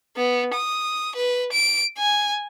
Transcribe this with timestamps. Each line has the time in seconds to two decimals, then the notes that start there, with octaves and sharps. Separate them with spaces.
0.16 B3
0.55 D#6
1.16 B4
1.52 D7
1.98 G#5